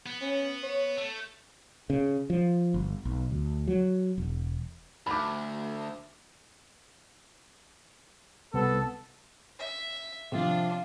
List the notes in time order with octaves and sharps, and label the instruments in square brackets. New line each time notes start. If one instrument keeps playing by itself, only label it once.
[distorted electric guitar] B3
[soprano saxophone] C#4
C#5
[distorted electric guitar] A3
[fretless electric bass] C#3
F3
G1
B1
D2
F#3
E1
[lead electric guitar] D2 [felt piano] B5 D6
[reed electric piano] C2 [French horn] B3 [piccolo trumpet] A4
[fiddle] E5
[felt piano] C3 F3 [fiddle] D4 F4